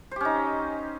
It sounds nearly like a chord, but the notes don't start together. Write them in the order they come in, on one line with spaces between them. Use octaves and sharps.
C5 G4 C#4 D#4